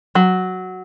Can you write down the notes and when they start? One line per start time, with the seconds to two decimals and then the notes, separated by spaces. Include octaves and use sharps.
0.15 F#3